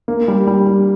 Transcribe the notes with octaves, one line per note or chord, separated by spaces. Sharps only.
A#3
G3
G3
G3